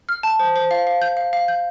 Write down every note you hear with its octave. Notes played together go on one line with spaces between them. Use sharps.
F6
A5
C5
C5
F5
F5
G6
F5
F5
G6